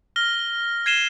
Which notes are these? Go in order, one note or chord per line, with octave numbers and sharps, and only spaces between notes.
F6 A#6 G7
G#6 C7 D#7 E7 G7